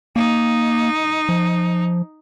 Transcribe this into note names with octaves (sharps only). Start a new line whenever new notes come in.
A#3 D#4
F3